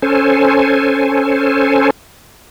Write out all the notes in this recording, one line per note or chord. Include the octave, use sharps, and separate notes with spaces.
C#4 A4 C5 G#5